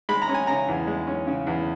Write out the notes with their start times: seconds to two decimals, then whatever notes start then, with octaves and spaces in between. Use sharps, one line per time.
0.09 G#3 B5
0.22 A#5
0.29 C#4
0.34 G#5
0.47 C#3 A#5
0.68 E2
0.87 G#3
1.07 C#4
1.27 C#3
1.47 E2